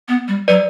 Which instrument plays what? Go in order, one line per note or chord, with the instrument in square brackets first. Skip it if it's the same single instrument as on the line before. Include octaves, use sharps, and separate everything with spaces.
[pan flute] B3
G3
[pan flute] F#3 [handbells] B4 D5